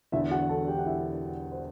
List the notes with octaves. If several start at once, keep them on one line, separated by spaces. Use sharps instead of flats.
E1 E2 D3 E4 E5
F#4 F#5
A4 A5
G4 G5
F#5
E4 E5
C5